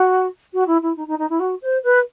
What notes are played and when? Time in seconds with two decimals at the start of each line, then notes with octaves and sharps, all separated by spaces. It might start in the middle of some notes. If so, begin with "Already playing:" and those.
Already playing: F#4
0.53 F#4
0.66 E4
0.82 E4
0.96 D#4
1.07 D#4
1.18 D#4
1.29 E4
1.39 F#4
1.61 C5
1.83 B4